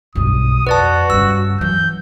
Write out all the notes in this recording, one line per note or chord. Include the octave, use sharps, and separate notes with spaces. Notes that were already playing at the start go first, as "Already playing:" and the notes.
B1 G2 D#6
F2 F#4 B4 D5 A5
G2 C#3 E6
E3 F#3 G6